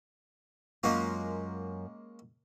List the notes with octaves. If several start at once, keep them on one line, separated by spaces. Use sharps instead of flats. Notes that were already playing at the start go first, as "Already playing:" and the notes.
F#2 G#3 A#3 C#4 F4